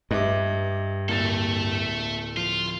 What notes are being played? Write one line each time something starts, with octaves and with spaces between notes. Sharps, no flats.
G2 B4 D#5 E5 D6
D1 A3 A#3 A4 A6 F7
F3 F4